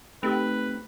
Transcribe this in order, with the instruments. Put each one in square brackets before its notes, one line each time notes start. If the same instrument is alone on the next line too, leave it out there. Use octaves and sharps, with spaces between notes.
[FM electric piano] A3 D#4 G4 [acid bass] C4 [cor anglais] B4